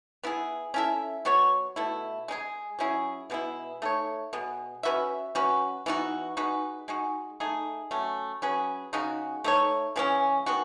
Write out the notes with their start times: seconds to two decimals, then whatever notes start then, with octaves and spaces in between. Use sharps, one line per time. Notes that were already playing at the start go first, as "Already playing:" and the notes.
0.23 B3 E4 G#4
0.74 C#4 E4 A4 E5
1.25 F#3 B3 F#4 C#5
1.76 B2 A3 E4
2.28 G#3 D#4 G#4
2.79 F#3 C#4 E4 G#4
3.30 B2 G#3 B3 E4
3.82 A3 D#4 A4 C#5
4.33 B2 G#3 B3
4.83 C#4 F#4 B4 E5
5.35 F#3 C#4 F#4 B4
5.86 E3 B3 D#4 F#4
6.37 G#3 D#4 F#4 B4
6.88 G#3 D#4 F#4
7.40 A3 D#4 G#4
7.91 F#3 A3 C#4
8.42 F#3 C#4 G#4 B4
8.93 C#3 G#3 D#4 F#4
9.44 A3 D#4 G#4 C#5
9.96 C#3 E3 G#3 C#4
10.46 D#3 G#3 B3 F#4